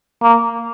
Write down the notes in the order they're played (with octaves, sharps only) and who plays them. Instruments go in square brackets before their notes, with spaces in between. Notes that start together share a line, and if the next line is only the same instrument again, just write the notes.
[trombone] A#3